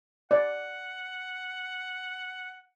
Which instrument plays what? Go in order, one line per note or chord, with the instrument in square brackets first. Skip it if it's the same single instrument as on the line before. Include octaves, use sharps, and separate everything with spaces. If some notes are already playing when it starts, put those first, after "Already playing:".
[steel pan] D5 [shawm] F#5